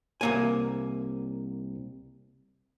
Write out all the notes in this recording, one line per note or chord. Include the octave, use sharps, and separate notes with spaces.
C2 A#3 G#5